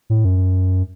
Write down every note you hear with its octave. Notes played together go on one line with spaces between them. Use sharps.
A2
F#2